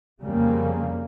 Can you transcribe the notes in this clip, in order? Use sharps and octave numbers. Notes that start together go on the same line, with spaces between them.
F2 C#3 G3 A#3